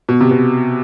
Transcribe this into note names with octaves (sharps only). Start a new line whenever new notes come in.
B2
C3
B2